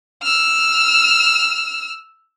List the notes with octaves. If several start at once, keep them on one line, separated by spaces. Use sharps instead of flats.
E6 F6